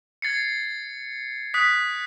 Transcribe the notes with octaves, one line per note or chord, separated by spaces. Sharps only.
G#6 A6 C7 C#7
D#6 F#6 B6